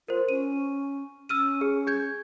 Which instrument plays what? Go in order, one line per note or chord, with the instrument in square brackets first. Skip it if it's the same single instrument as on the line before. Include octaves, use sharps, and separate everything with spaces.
[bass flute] F4 [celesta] A#4 C5
[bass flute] C#4 [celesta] D#7
[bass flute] C#4 [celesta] E6 F6 D#7
[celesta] G#4
G#4 G6 G#6